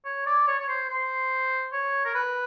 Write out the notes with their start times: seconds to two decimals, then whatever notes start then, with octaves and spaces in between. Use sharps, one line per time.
0.05 C#5
0.26 D5
0.47 C#5
0.59 C#5
0.68 C5
0.89 C5
1.73 C#5
2.05 A#4
2.14 B4